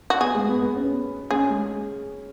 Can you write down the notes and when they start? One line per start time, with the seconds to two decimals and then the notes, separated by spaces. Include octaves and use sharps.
0.10 F#4
0.21 B3 G#4
0.35 G#3
0.48 B3
0.62 B3
0.76 C#4
1.31 C#4 G#4
1.49 G#3